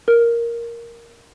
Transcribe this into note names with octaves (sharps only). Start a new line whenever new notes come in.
A#4